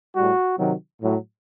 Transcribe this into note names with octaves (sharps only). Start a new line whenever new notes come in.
A2 G3 F#4
C3 D#3 F#3
A2 F#3